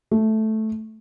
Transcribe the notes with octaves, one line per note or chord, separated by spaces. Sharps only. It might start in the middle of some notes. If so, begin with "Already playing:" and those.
A3